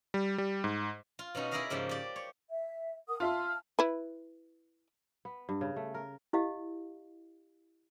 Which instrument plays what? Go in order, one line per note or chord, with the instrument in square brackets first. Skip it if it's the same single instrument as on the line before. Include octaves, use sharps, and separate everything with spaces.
[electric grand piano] G3
G3
G#2
[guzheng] F4
B2 C#4 D#4 F#4
E4 G#4 A#4 D5 D#5 F5
G#2 C#3 F3 A#3 G4
G4 D5
C#5
[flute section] E5
A#4 F#5 D#6
[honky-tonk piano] F4 E5 C6 [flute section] A5 F6
[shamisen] E4 B4
[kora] B3
G2
C#3
A3
A#4
[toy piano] E4 G4 D#5 F5